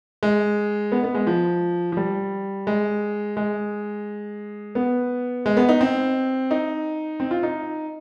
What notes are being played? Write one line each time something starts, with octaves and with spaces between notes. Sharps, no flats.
G#3
B3
B3
G#3
F3
F3
G3
G#3
G#3
B3
G#3
B3
D#4
C4
D#4
C4
F4
D#4